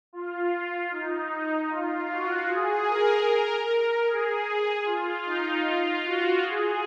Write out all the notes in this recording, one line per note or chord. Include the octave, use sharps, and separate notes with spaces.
F4
D#4
F4
F#4
G#4
A#4
G#4
F4
D#4
F4
F#4
G#4